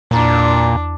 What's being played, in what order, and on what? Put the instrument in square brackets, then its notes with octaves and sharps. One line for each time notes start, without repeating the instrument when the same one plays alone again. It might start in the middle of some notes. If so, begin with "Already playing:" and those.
[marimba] E2 A#5 [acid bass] A#2 [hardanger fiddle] D4